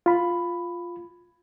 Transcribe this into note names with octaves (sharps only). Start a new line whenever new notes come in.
F4 B5